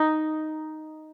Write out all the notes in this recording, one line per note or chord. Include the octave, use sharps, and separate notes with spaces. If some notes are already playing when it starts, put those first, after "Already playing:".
Already playing: D#4